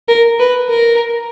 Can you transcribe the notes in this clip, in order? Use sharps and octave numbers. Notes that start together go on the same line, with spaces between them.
A#4
B4
A#4